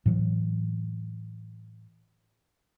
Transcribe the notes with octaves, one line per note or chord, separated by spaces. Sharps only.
A2 E3 F#3